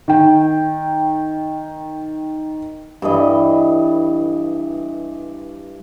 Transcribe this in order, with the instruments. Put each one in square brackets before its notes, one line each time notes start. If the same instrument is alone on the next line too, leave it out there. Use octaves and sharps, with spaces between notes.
[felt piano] D#3 G5
[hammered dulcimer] G2 E3 A4 D#5